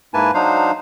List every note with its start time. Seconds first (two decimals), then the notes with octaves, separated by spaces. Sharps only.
0.14 G#2 A#3 E4 B4 G#5 A5
0.34 F#3 D4 D#4 C5 F5